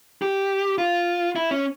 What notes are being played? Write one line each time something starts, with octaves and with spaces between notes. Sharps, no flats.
G4
F4
E4
C#4